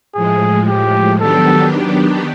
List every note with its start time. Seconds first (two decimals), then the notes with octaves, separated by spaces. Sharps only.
0.15 A2 F3 G#3 G#4
0.67 G4
1.19 D#3 F#3 B3 D4 G4 A4